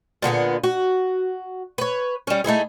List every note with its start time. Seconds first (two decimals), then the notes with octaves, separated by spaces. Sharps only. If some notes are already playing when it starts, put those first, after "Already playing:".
0.22 A#2 D3 B3 G#4
0.64 F#4
1.78 B4 C#5
2.27 G3 C#4
2.44 A3 D#4 E4 G#4